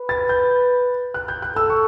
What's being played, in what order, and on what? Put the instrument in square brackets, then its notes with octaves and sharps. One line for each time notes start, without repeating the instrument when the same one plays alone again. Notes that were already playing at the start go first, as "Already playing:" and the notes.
Already playing: [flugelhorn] B4
[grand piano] A6
G6
F#6
G6
F#6
[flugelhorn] A4 [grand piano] E6
[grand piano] C#6